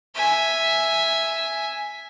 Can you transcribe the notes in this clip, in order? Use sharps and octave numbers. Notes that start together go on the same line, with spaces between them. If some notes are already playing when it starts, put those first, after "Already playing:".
E5 G#5